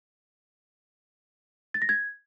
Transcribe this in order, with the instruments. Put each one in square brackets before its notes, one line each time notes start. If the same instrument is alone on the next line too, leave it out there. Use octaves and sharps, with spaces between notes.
[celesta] A6
A#6
G#6